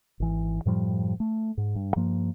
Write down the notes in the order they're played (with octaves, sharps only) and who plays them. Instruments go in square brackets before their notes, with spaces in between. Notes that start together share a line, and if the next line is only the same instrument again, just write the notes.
[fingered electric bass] G#1 E3
F#2 A2 F3 G3
A3
G#2
G2
G2 F3 A#3